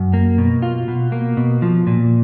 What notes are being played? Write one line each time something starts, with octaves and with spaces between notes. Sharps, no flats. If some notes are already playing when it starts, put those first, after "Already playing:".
Already playing: F#2
A#3
B2
F4
B2
A#3
B2
F3
A#2